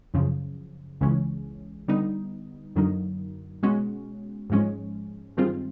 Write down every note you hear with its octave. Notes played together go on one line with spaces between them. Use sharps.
F#2 C#3 F3
C#2 C#3 E3 G#3 C#4
D3 G3 B3 D#4
F#2 D3 F#3 A#3 D#4
B2 G#3 C#4 F#4
G#2 F3 G#3 C#4
G2 D#3 G#3 C4 F4